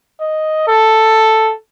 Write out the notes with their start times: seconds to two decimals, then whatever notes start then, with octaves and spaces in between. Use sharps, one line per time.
0.20 D#5
0.68 A4